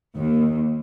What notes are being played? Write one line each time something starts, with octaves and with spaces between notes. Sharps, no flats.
D#2